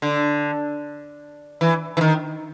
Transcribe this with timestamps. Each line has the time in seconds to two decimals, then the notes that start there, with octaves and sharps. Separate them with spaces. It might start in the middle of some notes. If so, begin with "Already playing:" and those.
0.02 D3
1.61 E3
1.97 E3
2.01 D#3